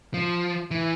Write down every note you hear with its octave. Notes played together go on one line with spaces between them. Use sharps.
F3
E3